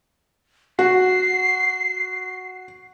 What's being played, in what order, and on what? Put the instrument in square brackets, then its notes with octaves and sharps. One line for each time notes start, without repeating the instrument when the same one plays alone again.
[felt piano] F#4 [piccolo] C7